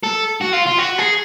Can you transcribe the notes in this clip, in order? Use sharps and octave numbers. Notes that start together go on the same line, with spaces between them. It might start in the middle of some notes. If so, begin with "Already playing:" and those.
A4
F#4
F4
F4
F#4
G#4